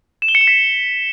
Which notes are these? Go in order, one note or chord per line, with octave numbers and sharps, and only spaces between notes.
E7
G7
C#7
E7
B6